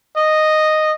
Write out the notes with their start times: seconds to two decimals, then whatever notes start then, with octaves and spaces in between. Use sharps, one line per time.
0.17 D#5